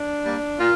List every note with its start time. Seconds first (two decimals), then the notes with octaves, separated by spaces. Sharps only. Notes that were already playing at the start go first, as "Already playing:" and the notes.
Already playing: D4
0.24 G3 A#3
0.58 A#2 F4